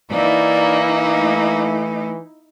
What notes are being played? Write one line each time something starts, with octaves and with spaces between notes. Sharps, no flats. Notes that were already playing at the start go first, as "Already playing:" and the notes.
E3 A#3 D#4 E4 D5
A3